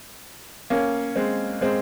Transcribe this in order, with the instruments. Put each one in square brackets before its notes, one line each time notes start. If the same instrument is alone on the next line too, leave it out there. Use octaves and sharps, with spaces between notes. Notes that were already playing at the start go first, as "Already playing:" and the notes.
[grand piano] A#3 C#4
G#3 C4
G#3 C4